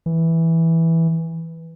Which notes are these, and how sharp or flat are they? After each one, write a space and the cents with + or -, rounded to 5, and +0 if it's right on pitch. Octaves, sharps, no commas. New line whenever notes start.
E3 -5